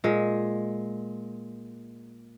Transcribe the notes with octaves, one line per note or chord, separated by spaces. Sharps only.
A#2 G#3